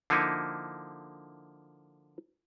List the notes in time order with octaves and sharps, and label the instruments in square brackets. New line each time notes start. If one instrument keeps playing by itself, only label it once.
[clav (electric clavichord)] D3 F3 A#3 D#4 E4